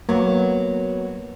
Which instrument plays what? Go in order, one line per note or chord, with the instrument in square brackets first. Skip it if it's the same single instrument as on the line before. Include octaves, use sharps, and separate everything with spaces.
[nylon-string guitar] F#3 B3 [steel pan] A#3